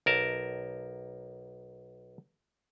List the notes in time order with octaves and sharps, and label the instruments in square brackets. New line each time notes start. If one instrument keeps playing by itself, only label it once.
[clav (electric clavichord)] B1 A#4 A5